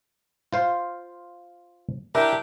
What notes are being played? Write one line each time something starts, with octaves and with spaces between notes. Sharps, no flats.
F4 C5 F5
D4 E4 G4 A#4